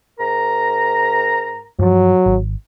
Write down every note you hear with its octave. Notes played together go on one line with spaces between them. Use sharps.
G#2 A#4 A#5
G2 F3 F#3
G#1